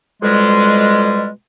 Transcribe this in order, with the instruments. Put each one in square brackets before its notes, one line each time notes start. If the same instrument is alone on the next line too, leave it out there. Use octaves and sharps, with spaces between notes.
[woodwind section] F2 B2 G3 G#3